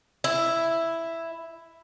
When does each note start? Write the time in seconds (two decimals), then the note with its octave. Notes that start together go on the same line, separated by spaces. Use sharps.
0.24 E4